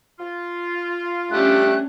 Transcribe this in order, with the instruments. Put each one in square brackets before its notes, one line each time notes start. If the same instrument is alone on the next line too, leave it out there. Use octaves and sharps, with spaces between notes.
[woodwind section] F4
[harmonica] G3 A3 G4 [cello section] C#4 D4 [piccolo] F#6